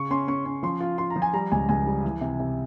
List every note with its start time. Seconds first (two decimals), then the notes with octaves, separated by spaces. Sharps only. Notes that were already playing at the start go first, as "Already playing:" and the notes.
Already playing: C#3 C#6
0.11 C#4 C6
0.28 C#4 C#6
0.46 C#4
0.63 F3 C6
0.81 F4
0.98 F4 C6
1.10 A#5
1.16 F3
1.22 G#5
1.33 G3 A#5
1.52 C#2 G#5
1.69 C#2 G#5
1.86 G3
2.04 E3
2.21 C3
2.40 C3